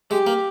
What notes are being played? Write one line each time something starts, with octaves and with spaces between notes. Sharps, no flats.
G#3 G4
A#3